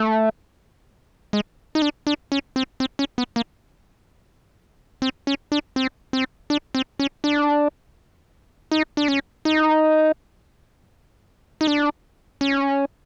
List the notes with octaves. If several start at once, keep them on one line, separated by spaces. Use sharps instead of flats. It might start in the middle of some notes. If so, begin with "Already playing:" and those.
Already playing: A3
G#3
D#4
D4
D4
C#4
C4
C4
C#4
B3
A#3
C4
C#4
D4
C4
C4
D4
C4
C#4
D4
D#4
D4
C#4
D#4
D#4
D4
C#4